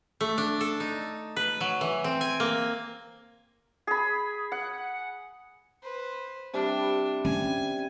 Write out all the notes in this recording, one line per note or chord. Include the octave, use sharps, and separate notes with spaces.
A3
D4
A4
D#4
B4
F#3
E3
C4
G#5
A#3
G#4 B5
F#5
B4 C5
C3 G3 D4
C#4 G#5